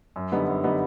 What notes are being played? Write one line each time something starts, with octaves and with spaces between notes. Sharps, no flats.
F#2
D3 G3 B3 D#4
F#2
D3 G3 B3 D#4